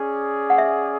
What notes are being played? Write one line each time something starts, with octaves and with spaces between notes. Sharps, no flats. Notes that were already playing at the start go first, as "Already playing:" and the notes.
Already playing: C#4 G#4 D5
F#5
E5